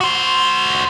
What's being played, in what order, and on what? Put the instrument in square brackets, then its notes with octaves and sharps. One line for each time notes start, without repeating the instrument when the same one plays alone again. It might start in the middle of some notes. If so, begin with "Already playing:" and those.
[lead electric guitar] F#4 C5